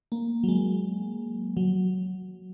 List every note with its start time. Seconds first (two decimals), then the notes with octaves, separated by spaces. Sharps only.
0.12 A#3
0.44 F#3
0.48 G#3
1.57 F#3